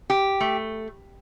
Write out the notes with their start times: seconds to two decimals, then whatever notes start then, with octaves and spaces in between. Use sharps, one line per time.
0.10 G4
0.40 A3